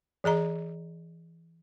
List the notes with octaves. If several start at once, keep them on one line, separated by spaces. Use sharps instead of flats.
E3 G#4 D#5 A#5